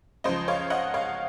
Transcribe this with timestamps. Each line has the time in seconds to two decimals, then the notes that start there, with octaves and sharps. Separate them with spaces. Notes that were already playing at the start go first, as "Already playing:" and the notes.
0.24 C#2 C#3 F3 C5 D#5
0.48 C#5 F5
0.70 D#5 F#5
0.94 C#5 F5